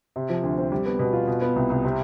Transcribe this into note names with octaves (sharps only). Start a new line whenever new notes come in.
C3
F3
D2
C4
G3
B3
B2
F4
B2
B3
C2
C2
C3